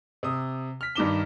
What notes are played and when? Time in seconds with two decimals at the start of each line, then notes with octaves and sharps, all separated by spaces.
0.23 C3 D#6
0.81 F6 B6
0.95 G2 D#3 D#4 D6 E7 G7